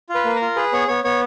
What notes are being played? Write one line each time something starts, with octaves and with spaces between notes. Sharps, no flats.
F4
B4
A#3
A#4
F4
G#4 B4
B3 C#5
B3 C#5
B3 C#5